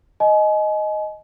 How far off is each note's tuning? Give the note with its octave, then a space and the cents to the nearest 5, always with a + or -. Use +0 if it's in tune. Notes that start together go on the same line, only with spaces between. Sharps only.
D#5 +0 G#5 +35